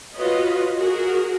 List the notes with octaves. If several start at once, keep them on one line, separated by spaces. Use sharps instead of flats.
F4 F#4 B4 C#5 D#5
F#4 G#4 A#4